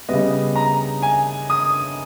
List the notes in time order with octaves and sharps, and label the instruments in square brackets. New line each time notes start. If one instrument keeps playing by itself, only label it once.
[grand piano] C#3 G3 B3 D#5
A#5
G#5
D#6